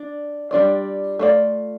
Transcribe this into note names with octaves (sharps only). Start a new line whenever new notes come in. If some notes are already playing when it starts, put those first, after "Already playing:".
Already playing: D4 D5
G3 D4 F4 D5
A3 F4 D5